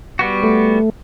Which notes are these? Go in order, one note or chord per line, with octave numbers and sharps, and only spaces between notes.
G3 B3 F#4
A3